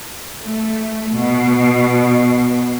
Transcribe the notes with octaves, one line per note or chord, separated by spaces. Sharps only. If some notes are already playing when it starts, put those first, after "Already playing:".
A3
B2